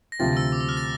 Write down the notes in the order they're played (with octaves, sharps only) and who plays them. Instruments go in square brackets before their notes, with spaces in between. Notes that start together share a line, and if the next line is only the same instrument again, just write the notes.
[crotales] A#6
[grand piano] D2 C3 F3 C4 F4 [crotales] A6
[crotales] E6
D6
E6
F6
A6